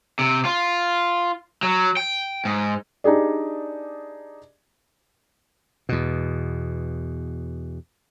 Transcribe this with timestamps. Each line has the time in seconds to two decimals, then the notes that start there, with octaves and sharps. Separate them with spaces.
0.19 C3
0.45 F4
1.63 F#3
1.97 G5
2.45 G#2
3.04 D4 D#4 G4 G#4 D5
5.89 E2 B2